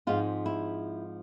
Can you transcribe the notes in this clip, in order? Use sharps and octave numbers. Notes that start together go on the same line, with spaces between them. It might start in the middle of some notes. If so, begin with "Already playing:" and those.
G#2 F3 G#3 C4 F4
E4